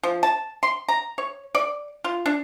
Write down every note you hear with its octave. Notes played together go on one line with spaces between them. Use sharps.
F3
A5
C6
A#5
C#5
D5
F4
D4